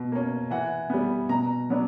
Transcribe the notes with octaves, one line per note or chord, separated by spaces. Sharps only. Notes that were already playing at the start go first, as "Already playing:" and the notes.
Already playing: B2
A#3 C#4
E3 F#5
G3 B3
B2 A#5
F#3 B3 D4